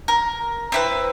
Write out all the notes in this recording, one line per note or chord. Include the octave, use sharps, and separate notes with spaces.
A#4
C4 E4 B4